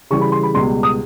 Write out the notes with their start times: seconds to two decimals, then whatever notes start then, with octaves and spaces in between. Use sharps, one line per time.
0.11 C#3 E3 G3 C#6
0.21 B5
0.32 C6
0.43 B5
0.54 C#2 B2 G3 C6
0.83 D#6